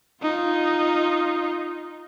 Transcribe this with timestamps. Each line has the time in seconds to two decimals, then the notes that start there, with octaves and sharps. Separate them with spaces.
0.22 D#4 F4